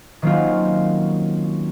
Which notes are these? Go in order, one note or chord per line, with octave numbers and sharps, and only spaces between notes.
D#3 F#3 A#3 C4 C#4 F4